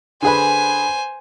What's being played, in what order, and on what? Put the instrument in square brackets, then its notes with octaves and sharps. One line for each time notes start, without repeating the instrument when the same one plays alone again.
[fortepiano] D3 G#4 B4 [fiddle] C5 G#5